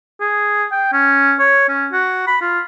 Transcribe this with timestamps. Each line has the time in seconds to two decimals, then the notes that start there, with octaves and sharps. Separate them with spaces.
0.20 G#4
0.71 G5
0.93 C#4
1.39 C#5
1.68 C#4
1.92 F#4
2.27 B5
2.41 F4